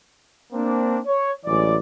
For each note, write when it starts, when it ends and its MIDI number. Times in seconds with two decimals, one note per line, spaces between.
0.53 0.99 58
0.53 0.99 60
0.53 0.99 62
1.06 1.32 73
1.45 1.76 33
1.45 1.76 52
1.45 1.76 54
1.45 1.76 56
1.45 1.76 74